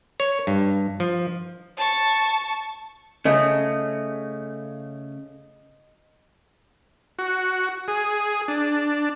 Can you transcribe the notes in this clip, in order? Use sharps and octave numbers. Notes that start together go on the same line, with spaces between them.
C#5
G2
F3
A5 C#6
C#3 A3 D#5
F#4
G#4
D4